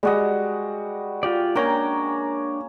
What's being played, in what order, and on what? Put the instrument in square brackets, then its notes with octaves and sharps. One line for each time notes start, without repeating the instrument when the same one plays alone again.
[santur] G3 F#4 D#5 [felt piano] G#3
[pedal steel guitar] F4 G4 D5
[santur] A#3 C#4 [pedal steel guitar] D4 G5 A#5